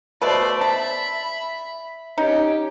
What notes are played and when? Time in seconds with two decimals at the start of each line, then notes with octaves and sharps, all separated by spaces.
0.22 B2 A3 B4 C5 D5
0.61 E5 A5 B5
2.18 C#4 D#4 G4